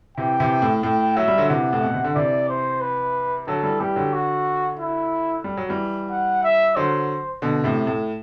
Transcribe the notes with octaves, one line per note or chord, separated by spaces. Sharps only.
C3 E3 G5
C3 E3
A2
A2 G5
F#3 E5
G3
D3 F#3
C3 E3 F#5
A2
B2
C3
D3
C3 E3 D5
C5
B4
D3 F#3 A4
E3 G3
E3 G3 G4
D3 F#3
F#4
E4
G3
F#3
E3 G3
F#5
E5
D3 F#3 C5
B2 D3
A2 C3
A2